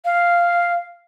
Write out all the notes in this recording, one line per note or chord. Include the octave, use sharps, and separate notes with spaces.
F5